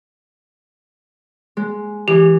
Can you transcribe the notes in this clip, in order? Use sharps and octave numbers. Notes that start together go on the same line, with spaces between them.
G#3
E3 G4